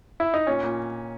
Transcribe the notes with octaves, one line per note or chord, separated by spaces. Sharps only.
E4
D#4
A#2 C#4
A#2